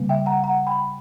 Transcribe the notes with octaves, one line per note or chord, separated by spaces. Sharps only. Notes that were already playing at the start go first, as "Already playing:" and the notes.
Already playing: C#3 G3 A#3
E5 G5
F#5 A#5
F#5 A#5
G5 B5